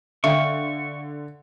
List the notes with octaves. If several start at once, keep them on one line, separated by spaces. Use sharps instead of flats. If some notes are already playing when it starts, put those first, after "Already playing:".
D3 E5 F5 G5 C#6